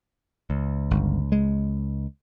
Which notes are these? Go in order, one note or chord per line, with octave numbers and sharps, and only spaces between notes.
C#2
G1
G#3